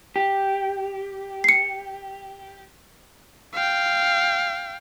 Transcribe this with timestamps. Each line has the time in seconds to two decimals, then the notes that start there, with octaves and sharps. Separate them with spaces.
0.16 G4
1.44 C7 C#7
3.53 F5 G5